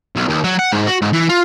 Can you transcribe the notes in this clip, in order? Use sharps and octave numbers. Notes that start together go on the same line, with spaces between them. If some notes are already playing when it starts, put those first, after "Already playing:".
B1
D#2
F#3
F#5
G#2
F#4
G#2
E3
F4